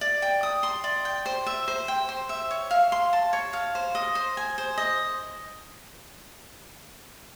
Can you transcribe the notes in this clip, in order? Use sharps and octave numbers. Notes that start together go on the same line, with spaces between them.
D5
G5
D#6
C6
D5
G5
C5
E5
C5
G5
C5
E5
C#5
F5
C6
A5
C#5
F5
C5
D#5
C5
G#5
C5
D#5